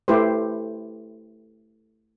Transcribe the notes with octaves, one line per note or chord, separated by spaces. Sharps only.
A3 E4 G4 B4 C5